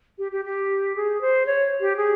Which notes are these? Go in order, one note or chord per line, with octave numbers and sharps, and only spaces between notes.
G4
G4
G4
G#4
C5
C#5
G4
G#4